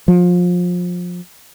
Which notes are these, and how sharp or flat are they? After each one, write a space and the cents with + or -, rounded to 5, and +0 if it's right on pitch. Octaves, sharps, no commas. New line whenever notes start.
F3 +25